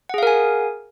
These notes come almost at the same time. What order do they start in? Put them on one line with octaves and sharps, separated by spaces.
F#5 G#4 F5 A#4 G#5